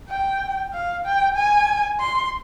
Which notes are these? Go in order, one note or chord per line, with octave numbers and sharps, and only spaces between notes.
G5
F5
G5
G#5
C6